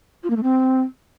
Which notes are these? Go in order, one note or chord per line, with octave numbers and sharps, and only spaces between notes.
F4
A#3
A3
C4